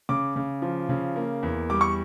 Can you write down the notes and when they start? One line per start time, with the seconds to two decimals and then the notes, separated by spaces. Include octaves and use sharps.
0.09 C#3 D6
0.36 C#3
0.62 F3
0.89 C#3
1.16 A#3
1.43 E2
1.70 G3 D6
1.81 C#6